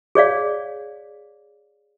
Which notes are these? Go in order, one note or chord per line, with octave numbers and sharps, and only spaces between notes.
G#4 C#5 D5 F5